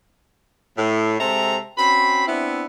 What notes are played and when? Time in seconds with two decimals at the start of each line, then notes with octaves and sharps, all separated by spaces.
0.78 A2
1.20 C3 G#3 C4 A4 E5 A#5
1.77 C4 C#4 F#4 B5
2.27 B3 C4 D4 E4